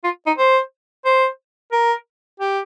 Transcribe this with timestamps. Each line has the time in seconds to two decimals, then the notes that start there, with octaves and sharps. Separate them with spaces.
0.04 F4
0.27 D#4
0.38 C5
1.05 C5
1.72 A#4
2.40 G4